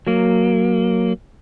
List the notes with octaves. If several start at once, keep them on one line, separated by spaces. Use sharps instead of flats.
F#3 A#3